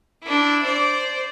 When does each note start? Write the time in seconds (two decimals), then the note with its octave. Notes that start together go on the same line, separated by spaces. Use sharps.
0.23 D4 E4
0.64 C5 D5